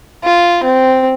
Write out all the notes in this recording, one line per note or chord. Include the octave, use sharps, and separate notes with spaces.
F4
C4